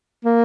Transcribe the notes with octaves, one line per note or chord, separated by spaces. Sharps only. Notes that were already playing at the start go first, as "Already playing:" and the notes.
A#3